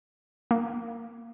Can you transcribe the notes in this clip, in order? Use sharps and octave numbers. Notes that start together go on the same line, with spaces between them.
A#3